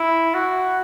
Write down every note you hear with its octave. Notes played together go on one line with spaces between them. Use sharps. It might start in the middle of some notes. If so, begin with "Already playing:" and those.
Already playing: E4
F#4